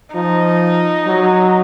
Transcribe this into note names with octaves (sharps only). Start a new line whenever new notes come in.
F3 D#4
F#3